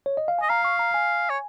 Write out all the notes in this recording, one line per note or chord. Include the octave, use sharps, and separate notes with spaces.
C#5
D#5
F5
D#5 G#5
F5 A#5
C#6
A#5
G#5
C#5